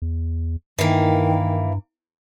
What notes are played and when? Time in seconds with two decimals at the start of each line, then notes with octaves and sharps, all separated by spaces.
0.02 E2
0.78 G2 D#3 E3 A#3